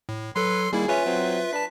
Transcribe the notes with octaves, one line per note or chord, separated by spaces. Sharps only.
A2
F#3 A4 B4 C6
D#3 G3 A#3 E4 G#4
C#4 F4 B4 E5
F#3 C4
D4 B4 A5 B6